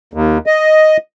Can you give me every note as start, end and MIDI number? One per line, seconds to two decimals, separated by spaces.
0.14 0.38 39
0.46 0.97 75